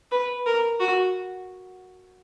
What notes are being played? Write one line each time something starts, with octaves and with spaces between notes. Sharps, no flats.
B4
A#4
F#4